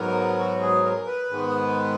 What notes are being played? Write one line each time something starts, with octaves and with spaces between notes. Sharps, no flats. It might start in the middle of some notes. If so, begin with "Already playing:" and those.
Already playing: G#2 F#3 B3 A#4
F#4
G#4
A#4
B4
G#2 D#3 G#3 B3